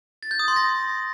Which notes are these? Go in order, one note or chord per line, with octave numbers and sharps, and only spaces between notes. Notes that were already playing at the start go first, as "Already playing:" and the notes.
A6
G6
D#6
C6
A#6